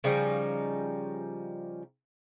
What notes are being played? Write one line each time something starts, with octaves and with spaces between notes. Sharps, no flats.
C#3 F3 G3 D#4